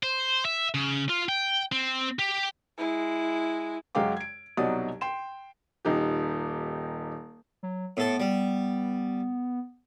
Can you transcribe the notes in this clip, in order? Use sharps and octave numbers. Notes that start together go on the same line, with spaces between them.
C5
E5
C#3
F4
G5
C4
G4
G#3 E4
F#2 F#3 G#3 F5 G5 D6
G#6 D7
C2 B2 F#3 D#4 D5 D#6
G5 C6 E7
D#1 D#4 G4
F#3
A2 B3 A4
G3